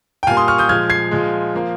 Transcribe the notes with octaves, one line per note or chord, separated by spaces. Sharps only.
G5
A#2 G3 A#3 F5 G#5
C6 D#6
C#6 F6
D#6 G6
A#2 F3 G#3 F6 G#6
G#6 C7
A#2 F3 G#3
F3 A#3